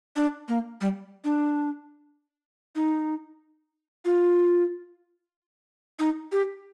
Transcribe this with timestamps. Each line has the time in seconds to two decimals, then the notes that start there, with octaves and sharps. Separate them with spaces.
0.16 D4
0.48 A#3
0.81 G3
1.24 D4
2.76 D#4
4.05 F4
5.99 D#4
6.32 G4